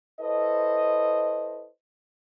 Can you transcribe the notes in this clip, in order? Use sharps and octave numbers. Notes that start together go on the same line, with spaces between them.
E4 A4 B4 C5 D#5